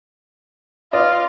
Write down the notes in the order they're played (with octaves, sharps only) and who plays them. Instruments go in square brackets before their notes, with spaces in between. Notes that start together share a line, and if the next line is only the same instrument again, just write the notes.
[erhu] F4 [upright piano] B4 D5 D#5